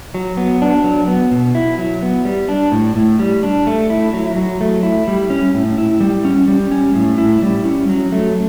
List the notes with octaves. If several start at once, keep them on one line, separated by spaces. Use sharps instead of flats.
F#3
B3
D4
F#3
B3
B2
E4
F#3
B3
G3
D4
A2
A2
G3
D4
A3
E4
F#3
F#3
A3
E4
G3
C#4
A2
E4
G3
C#4
G3
C#4
A2
E4
G3
C#4
F#3
A3